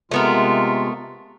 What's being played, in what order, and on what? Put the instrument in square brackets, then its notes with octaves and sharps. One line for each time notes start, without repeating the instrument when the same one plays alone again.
[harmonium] C3 G#3 F4 [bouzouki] A3 B3 A#4